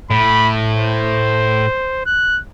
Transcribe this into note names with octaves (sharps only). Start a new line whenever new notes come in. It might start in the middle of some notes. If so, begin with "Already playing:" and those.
A2 B5
C5
F#6